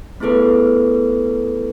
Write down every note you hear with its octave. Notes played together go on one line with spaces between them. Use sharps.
A3 B3 E4 G#4 A4 B4